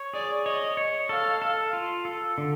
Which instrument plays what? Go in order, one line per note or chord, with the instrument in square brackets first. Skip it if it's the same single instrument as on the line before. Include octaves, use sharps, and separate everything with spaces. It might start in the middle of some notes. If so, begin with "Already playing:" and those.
Already playing: [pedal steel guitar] C#5
[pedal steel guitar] G#4 [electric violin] D5
[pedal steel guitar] C#5 [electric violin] D#5
[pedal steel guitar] C#5
[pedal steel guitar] A4 [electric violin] F5
[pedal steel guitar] A4
F4
A4
D3